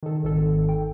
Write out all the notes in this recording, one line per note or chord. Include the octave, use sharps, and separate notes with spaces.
D#3 A4
G#1 D#3 A4
G5